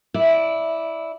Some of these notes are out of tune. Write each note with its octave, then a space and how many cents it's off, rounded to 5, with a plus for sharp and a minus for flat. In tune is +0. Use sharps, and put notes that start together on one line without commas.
E4 -10 D5 +0